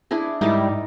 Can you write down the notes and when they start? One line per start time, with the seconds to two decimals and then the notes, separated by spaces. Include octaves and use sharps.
0.11 D4 E4 G#4
0.41 G#2 G3 D#4 E4 A#4 D6